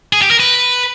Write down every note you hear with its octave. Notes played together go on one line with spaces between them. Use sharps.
G#4
G4
A#4
B4